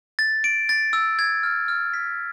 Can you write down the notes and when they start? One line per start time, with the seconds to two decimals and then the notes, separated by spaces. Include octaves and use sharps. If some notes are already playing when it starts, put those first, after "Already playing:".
0.19 A6
0.44 D7
0.69 A6
0.93 E6
1.19 G#6
1.43 F6
1.68 F6
1.94 B6